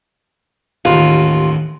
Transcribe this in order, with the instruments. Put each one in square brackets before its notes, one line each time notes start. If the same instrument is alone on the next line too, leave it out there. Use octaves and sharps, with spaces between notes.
[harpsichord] A1 D#2 F#4 [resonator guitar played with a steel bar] F4